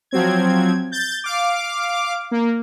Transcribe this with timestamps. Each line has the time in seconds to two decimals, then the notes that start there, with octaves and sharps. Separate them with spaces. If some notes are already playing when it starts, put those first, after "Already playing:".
0.11 F3 F#3 C4 G#6
0.92 G6 A6
1.24 F5 D6
2.31 A#3